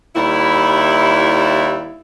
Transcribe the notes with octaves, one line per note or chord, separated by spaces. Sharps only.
D#2 G3 E4